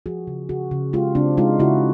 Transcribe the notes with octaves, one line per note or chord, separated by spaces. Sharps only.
F3 F#4 G#4
C#3
C#3 F#4 G#4
C#3
G#3 F4 G4
C#3 C4 D4
G#3 D#4 F4
C#3 E4 F#4